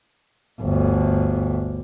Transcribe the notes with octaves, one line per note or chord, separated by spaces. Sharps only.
G1 D2